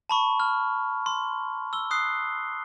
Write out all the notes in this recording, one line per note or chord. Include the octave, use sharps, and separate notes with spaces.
A5 B5 C#6
F6
C6
E6 G7
D#6 F#6 C7